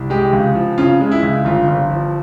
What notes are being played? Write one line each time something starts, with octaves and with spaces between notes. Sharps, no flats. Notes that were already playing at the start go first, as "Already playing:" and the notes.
Already playing: C2
G#3 G4
C#2
F3
C#3 F4
G#3
E4
C#2
G1 F4
G1
F3